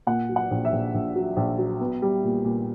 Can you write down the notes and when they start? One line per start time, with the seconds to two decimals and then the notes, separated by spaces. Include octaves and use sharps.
0.07 A#2 F#5
0.29 F#3
0.36 F#5
0.51 A#1
0.65 E5
0.72 A#1
0.94 A#1
1.16 F#3
1.36 A#1
1.58 F#3
1.81 B3
2.02 G3
2.24 A#2
2.45 A#2